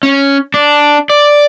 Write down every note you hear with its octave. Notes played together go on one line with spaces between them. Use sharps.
C#4
D4
D5